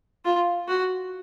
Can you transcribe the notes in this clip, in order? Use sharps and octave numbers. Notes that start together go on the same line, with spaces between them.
F4
F#4